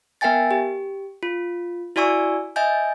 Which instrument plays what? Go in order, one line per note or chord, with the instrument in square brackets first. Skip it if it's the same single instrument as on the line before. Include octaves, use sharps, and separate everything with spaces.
[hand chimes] B3 A#4 E5 G5 G#5 A6
G4
F4
E4 F#4 D5 G#5 C#6 E6
D#5 E5 G#5 G6